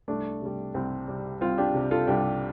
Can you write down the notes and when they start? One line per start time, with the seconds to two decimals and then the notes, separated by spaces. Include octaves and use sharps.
0.08 C2 A3 D4
0.42 C3 G3
0.74 C2 C4
1.08 C3 G3
1.41 C2 C4 F4
1.58 D4 G4
1.74 C3 G3
1.91 F4 A4
2.07 C2 D4 G4